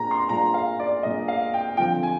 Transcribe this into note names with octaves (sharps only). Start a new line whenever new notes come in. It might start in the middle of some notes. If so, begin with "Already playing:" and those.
Already playing: A#2 G#3 D4 F4 A#5
C6
A#2 G#3 D4 F4 A#5
F5
D5
A#2 G#3 D4 F4 D#5
F5
G5
D3 F3 C4 F4 G5
G#5